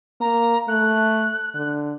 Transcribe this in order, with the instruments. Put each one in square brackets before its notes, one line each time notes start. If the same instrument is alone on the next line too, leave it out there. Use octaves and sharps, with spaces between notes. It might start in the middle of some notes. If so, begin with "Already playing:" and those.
[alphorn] A#3 [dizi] A#5
[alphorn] A3 [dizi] F#6
[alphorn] D3